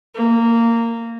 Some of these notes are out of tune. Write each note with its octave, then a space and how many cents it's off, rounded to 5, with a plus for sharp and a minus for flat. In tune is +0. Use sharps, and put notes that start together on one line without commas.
A#3 -15